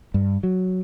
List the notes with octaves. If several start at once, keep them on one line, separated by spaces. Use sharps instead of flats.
G2
F#3